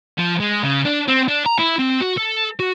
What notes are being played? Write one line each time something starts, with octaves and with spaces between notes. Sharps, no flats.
F3
G#3
C#3
D4
C4
D4
A#5
E4
C4
F#4
A4
F#4